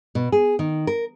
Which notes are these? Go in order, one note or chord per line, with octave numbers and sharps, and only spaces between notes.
B2
G#4
D#3
A#4